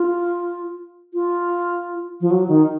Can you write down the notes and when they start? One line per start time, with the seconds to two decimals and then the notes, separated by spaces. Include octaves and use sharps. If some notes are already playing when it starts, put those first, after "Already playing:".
Already playing: F4
1.14 F4
2.21 F3
2.30 F#3
2.48 D#3